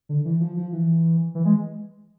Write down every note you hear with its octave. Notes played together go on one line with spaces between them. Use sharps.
D3
E3
F3
F3
E3
E3
G#3